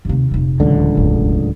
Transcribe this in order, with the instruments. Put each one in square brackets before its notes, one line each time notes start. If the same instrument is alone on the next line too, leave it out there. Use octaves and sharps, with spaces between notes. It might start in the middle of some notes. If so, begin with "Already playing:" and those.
[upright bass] D#2 C3
F1 A#2
[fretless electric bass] D1 C#2 D3 [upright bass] E3
[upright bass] E1 A1